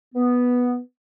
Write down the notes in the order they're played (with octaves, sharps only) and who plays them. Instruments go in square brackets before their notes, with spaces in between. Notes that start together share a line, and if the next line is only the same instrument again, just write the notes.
[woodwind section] B3